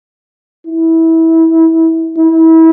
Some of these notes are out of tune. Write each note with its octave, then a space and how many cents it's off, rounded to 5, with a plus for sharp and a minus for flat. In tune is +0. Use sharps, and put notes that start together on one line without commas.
E4 -20
E4 -30